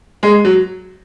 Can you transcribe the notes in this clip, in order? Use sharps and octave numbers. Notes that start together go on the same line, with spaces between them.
G#3
F#3